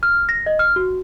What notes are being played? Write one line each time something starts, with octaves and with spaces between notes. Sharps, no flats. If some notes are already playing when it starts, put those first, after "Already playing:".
F6
A#6
D#5
F6
F#4